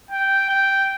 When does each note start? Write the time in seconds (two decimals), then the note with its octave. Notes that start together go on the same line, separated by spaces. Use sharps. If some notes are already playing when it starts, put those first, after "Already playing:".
0.11 G5
0.49 G5